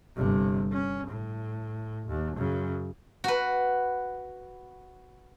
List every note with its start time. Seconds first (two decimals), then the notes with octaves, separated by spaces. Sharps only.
0.16 G1 C3
0.72 C#4
1.08 A2
2.08 D#2
2.37 F#2 C#3
3.24 F#4 B4